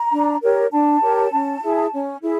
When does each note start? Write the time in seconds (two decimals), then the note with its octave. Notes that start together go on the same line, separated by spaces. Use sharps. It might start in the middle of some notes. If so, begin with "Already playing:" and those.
Already playing: A#5
0.12 D4
0.42 G4 A#4 C#5
0.72 D4 A5
1.02 G4 A#4 C#5
1.32 C#4
1.62 E4 G#4
1.93 C#4
2.22 E4 G#4